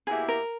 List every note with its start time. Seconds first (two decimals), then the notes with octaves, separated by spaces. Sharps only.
0.07 B2 A#3 E4 G4 G#4
0.29 A#4